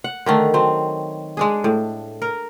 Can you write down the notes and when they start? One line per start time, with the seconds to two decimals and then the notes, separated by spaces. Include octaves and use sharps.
0.04 F#5
0.26 D3 D#3 A3
0.54 F#3 C4
1.37 G#3 D4 G#4
1.64 A2
2.22 A#4